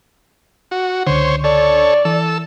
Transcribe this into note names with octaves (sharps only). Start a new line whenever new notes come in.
F#4
C#2 D3 C5 C#5
A4 C#5 D5
E3 A4 E6